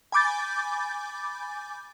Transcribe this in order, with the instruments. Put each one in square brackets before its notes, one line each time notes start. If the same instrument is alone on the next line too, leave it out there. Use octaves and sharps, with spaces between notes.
[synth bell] G#5 B5 D6 G6 A6